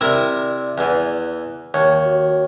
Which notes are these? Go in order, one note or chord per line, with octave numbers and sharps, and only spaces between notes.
C3 E4 A#4 D5
E2 E3
D#2 D#3 C#5
F#4